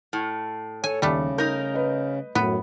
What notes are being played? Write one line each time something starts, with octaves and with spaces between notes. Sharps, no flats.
A2
A4 C#5 G#5
D#2 C#3 G3 A3
D#4 A#4 G6 A#6
B4 D#5
F#2 A2 B3